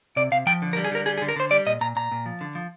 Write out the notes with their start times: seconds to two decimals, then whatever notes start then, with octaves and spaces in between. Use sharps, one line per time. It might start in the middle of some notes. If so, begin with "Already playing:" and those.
0.16 C3 D5
0.32 C3 F5
0.46 F3 G5
0.62 D3
0.73 A#4
0.77 G3
0.84 G#4
0.92 D3 A#4
1.06 G3 G#4
1.18 G#4
1.22 D3
1.29 A#4
1.36 D3 C5
1.51 G3 D5
1.66 A#2 D#5
1.81 A#2 A#5
1.96 A#2 A#5
2.12 A#2
2.26 F3
2.41 D3
2.55 F3